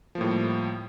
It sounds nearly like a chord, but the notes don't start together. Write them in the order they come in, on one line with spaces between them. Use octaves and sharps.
F3 A#3 A2 G3